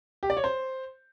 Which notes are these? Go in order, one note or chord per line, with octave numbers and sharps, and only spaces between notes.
G4
D5
C#5
C5